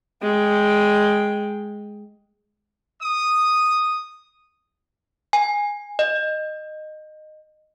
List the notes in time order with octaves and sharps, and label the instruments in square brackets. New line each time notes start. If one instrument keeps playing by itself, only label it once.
[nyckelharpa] G#3 G5
[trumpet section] D#6
[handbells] G#5
D#5